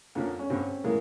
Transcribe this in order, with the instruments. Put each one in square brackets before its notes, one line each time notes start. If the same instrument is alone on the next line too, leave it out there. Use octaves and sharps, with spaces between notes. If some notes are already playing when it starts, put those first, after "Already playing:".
[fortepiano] F2 D3 F3 A#3 C#4
[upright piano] C#4
[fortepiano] G2 D3 G3 [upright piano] C4
[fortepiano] A2 E3 G#3 [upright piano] A#3